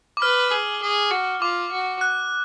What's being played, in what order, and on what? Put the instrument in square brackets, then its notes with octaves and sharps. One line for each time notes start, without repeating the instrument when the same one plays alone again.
[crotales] D6
[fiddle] B4 [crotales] F6
[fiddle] G#4
G#4
F#4
[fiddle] F4 [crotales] D6
[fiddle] F#4
[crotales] F#6